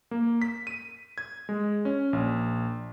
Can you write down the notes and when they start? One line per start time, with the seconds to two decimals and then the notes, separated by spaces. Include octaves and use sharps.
0.11 A#3
0.42 B6
0.67 D#7
1.18 G#6
1.49 G#3
1.85 C#4
2.13 A#1